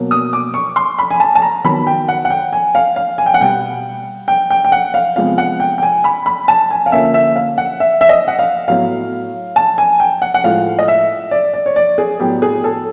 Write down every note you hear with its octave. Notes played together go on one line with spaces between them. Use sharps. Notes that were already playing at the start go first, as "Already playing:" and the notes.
Already playing: B2 F#3 A#3
D#6
D6
C#6
C6
B5
G#5
A5
A5
A#5
D#3 F#3 B3 B5
G5
F#5
F#5
G5
G#5
F5
F5
G#5
G5
F#5
B2 G3 B3 G5
G5
G5
G5
F#5
F5
C3 F3 G#3 B3 F5
F#5
G5
G5
G#5
B5
B5
A5
G#5
F5
D3 F3 A#3 C#4 E5
E5
F5
F#5
E5
E5
D#5
F#5
F5
A2 F#3 B3 F5
A5
G#5
G5
F#5
F#5
A2 F3 G#3 F5
D#5
E5
D5
D5
C#5
D5
G#4
A2 F#3 B3 G4
G#4
A4